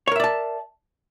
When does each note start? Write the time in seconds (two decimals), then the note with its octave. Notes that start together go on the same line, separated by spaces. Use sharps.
0.07 C#5
0.12 A#4
0.16 E5
0.20 D5
0.24 A5